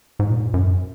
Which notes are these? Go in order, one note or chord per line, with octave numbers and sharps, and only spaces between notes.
G#2
A#2
G#2
F#2